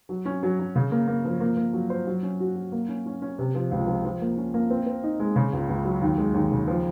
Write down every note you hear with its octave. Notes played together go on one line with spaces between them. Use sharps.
F#3
C#4
F#3
F#3
C#3
A#3
A#3
F3
A#3
A#3
F#3
C5
F#3
C#4
F#4
F#3
A#3
C#4
C#4
C#4
C3
F3
C#2
F3
F3
A#3
C#4
A#3
C4
C4
D#4
G#3
C#3
C#2
C#2
F#3
D#2
G#3
D#2
C#3
F3